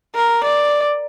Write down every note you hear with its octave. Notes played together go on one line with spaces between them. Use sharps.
A#4
D5